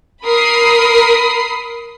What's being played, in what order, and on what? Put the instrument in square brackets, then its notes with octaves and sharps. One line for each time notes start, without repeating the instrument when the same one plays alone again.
[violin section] A#4 B5 D#6 C7